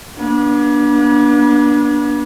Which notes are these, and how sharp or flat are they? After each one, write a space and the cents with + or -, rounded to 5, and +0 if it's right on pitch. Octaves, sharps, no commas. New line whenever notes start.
B3 -40 D4 +0